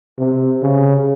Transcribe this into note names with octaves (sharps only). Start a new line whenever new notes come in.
C3
C#3